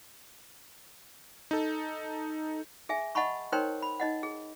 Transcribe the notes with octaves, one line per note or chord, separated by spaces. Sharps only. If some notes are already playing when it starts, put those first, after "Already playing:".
D#4 A4
G#4 E5 G#5
D#5 F#5 A5 B5 C#6
D#4 A#4 C5 C#5 G5 C6
B5
D#4 D#5 F#5
G#4